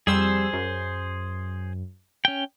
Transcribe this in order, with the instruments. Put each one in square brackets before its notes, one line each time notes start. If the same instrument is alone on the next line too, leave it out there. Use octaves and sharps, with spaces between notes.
[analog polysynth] F2 G3 E6 [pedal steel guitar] G#4 C5
[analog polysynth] F#2
[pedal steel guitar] C#4 G5